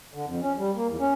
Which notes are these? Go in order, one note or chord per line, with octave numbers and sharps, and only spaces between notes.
D3
F2
C#4
G3
A#3
E2
C#4